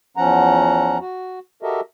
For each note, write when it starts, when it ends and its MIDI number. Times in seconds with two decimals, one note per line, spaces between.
0.17 0.98 40
0.17 0.98 53
0.17 0.98 61
0.17 0.98 78
0.17 0.98 82
1.00 1.39 66
1.63 1.81 66
1.63 1.81 67
1.63 1.81 69
1.63 1.81 70
1.63 1.81 75
1.63 1.81 76